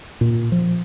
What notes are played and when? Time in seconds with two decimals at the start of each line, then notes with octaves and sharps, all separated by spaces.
0.21 A#2
0.52 F3